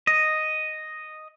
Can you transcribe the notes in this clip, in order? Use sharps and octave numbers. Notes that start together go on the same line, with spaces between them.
D#5